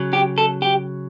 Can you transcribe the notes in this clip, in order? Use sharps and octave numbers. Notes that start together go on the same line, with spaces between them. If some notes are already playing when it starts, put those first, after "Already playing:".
Already playing: C#3 F#3
G4
A4
G4